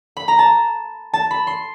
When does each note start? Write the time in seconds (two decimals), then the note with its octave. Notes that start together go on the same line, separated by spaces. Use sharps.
0.17 B5
0.28 A#5
0.39 A5
1.13 A5
1.31 B5
1.47 C6